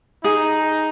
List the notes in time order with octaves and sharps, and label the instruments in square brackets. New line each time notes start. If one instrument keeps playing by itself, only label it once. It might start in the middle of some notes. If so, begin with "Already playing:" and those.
[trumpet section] D#4 [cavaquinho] G#4